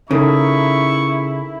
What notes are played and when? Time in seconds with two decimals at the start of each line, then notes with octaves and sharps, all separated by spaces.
0.11 C#3 D#4 E4 A4 A#4 C#6